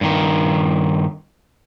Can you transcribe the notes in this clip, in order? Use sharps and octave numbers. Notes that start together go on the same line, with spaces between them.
G2 D#3